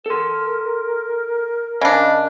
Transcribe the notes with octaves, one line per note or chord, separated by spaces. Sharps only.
A4 A#4 C6
C#3 D4 D#5